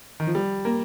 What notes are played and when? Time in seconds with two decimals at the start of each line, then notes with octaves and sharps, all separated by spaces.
0.20 D#3
0.27 F3
0.35 G3
0.65 A#3